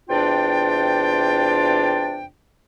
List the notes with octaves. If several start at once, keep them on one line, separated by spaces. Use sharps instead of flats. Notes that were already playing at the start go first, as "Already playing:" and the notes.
E2 C3 D4 F4 D5 G5